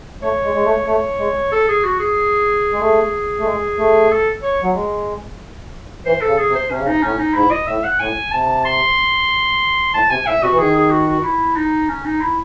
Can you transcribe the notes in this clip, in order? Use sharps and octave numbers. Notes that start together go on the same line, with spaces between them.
A3 C#5
G#3
G#3
A3
A3 C#5
G#3
A4
G#4
F#4
G#4
G#3
A3 G#4
A3
G#3
A3
A4
C#5
F#3
G#3
E3 C5
A4
C#3
G#4
C3
C5
C3 C#4
C#3
C3 D#4
A2 C#4
D#4
G#2 E4
D#5
A2 E5
F#5
A2 G#5
C3 A5
C6
A2 A5
C3 G#5
A2 E5
C3 F#4
E3
D#3 G#4
G#4
F#4
F#4
E4
D#4
C#4
D#4
E4